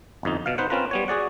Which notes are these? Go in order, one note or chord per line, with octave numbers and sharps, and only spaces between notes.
G1 F2 D#4
B2 F5
D#4 B4 C5 F#5
C4 C#4 F4 A#4 B4
G3 B3 C#5
F#4 G#4 D5 F#5